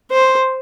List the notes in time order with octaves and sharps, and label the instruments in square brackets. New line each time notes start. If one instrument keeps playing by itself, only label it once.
[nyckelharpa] C5